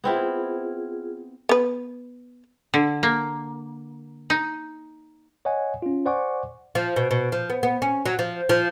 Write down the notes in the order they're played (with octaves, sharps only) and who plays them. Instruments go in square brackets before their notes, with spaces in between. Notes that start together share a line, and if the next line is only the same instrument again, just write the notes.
[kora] B3 C4 E4 [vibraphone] F4 G#4
[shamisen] B3 B4
[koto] D3
A#3
D#4
[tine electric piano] C#5 D#5 F#5 G#5
C#4 F4
C5 D5 F#5 G#5 C#6 D6
[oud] F3
B2
B2
F3
B3
B3
C#4
F#3
F3
F3